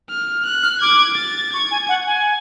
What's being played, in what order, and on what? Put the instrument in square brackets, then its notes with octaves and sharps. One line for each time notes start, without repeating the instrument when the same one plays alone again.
[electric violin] F6
F#6
[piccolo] F6
[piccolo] D6 [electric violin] G#6
[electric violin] A6
[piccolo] C#6 [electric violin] G#6
[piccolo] G#5
F#5
G#5